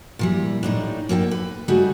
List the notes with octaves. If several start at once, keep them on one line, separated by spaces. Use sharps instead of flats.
A#2 E3 G3
A2 D4 D#4
A#3 A4 F5 G5
B4
C#3 G3 A3 D#4 F#4 G#4